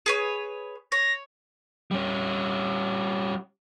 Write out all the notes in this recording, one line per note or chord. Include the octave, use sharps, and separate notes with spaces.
G#4 B4 C#5
C#5 A#6
G3 C#4